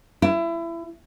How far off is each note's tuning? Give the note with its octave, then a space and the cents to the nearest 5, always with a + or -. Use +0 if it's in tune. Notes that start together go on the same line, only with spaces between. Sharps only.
E4 +25